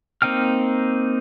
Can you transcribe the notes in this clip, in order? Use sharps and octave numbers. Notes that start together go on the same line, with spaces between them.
A#3 C4 D#4 G5 F6